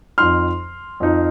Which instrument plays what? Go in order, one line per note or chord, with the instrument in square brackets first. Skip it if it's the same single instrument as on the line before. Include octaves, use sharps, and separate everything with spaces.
[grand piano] F2 F3 D#4 C6 F6
F2 F3 D#4